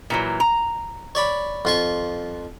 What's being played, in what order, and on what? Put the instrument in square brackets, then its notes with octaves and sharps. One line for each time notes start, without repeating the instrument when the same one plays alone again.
[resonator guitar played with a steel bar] A#2 E3 F#3
A#5
[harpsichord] C#5 D5 B5
F2 F4 C#6